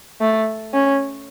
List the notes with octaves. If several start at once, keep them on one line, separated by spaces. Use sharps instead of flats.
A3
C#4